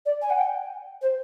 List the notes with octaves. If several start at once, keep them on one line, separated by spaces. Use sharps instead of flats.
D5
G#5
F#5
G5
C5